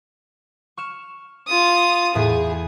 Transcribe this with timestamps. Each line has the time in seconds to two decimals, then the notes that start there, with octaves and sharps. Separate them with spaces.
0.77 C#6 F6 E7
1.48 F4 D#6
2.15 E2 A2 G#4